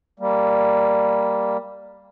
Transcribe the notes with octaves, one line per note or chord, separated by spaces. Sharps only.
G3 A#3